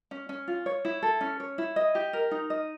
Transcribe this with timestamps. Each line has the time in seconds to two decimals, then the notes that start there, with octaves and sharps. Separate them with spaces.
0.11 C#4
0.29 C#4
0.48 F4
0.66 C#5
0.85 E4
1.03 A4
1.21 C#4
1.40 C#5
1.58 E4
1.76 D#5
1.95 G4
2.13 A#4
2.31 D#4
2.50 D#5